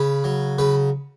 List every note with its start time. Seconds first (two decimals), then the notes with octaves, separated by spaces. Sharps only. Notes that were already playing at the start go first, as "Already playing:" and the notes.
Already playing: C#3 B4
0.24 F#3
0.58 C#3 B4